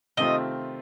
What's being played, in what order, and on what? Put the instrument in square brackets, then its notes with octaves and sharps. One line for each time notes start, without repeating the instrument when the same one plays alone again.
[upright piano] C3 D#3 A3 C4 F4 [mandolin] D#5